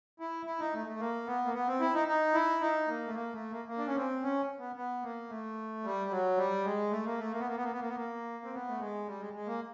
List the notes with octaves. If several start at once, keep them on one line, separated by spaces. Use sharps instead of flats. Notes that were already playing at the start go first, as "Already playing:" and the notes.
E4
E4
D#4
A3
A3
A#3
B3
A#3
B3
C4
E4
D#4
D#4
E4
D#4
A#3
A3
A#3
A3
A#3
A#3
D4
C#4
C4
C#4
B3
B3
A#3
A3
G3
F#3
G3
G#3
A3
A#3
A3
A#3
B3
A#3
B3
A#3
B3
A#3
B3
A#3
C4
B3
A3
G#3
G3
G#3
G#3
A#3